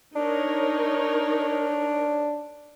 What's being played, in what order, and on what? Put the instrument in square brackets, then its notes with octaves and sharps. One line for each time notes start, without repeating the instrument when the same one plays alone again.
[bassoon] D4 [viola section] D#4 A#4 C#5